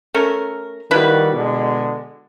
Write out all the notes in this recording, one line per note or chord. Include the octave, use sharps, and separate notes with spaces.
A3 C#4 A#4
D#3 F3 G3 E4 F#4 B4
B2 D3 G#3